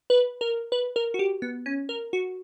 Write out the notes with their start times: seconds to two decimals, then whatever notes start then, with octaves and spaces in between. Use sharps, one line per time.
0.10 B4
0.41 A#4
0.72 B4
0.96 A#4
1.14 F#4
1.19 G4
1.42 B3
1.66 C#4
1.89 A#4
2.13 F#4